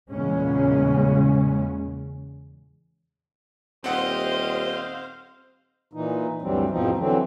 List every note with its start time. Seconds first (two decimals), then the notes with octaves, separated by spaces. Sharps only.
0.12 E2 A#2 C#3 G#3 C#4
3.84 D#1 C4 G4 C5 D#5 F5 F#5
5.93 A#2 E3 D#4
6.42 D2 G2 E3 F#3 G3 C4
6.70 E2 G#2 B2 F3 C4 D#4
6.98 D3 E3 F#3 C4